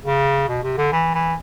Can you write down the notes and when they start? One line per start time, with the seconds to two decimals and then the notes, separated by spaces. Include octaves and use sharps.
0.05 C#3
0.48 B2
0.63 C3
0.77 D3
0.92 E3
1.14 E3